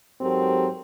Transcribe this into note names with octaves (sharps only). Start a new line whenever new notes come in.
G#2 F#3 C4 G4 A4 A#4